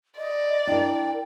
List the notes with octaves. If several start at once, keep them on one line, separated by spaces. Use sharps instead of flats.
D5 D#5
D4 E4 A#4 G5 D7